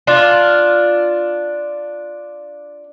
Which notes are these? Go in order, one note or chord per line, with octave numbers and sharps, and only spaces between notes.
D4 F4